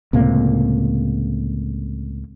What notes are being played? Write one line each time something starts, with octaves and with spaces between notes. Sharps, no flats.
C#2 A2 C3 A#3